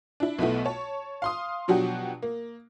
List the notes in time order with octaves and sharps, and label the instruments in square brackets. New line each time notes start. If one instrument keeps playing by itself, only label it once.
[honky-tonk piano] D4 E4
B1 B2 A3 B3 E4
C#5 A5
F5 C6 D#6
B2 F3 F#3 D4 F#4 G4
A#3